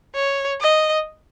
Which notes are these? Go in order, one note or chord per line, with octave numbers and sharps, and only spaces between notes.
C#5
D#5